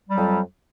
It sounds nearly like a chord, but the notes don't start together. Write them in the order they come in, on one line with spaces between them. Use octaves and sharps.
G3 F#3 F2